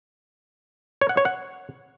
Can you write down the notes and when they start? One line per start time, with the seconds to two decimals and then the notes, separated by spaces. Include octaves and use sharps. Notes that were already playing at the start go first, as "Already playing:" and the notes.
1.01 C#5
1.09 F#5
1.17 C#5
1.25 F#5